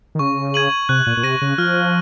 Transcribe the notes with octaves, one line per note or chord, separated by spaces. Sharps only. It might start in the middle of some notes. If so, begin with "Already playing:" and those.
D#3
C#3 C#6
G#6 D#7 F#7
C3 F#6
A#2
A#2
C3 A#6 D#7
C#3
F3 F6